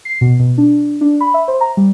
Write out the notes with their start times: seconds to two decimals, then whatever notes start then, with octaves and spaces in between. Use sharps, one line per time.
0.05 C7
0.21 B2
0.40 B2
0.58 D4
1.01 D4
1.21 B5
1.34 E5
1.48 C5
1.61 A#5
1.77 G3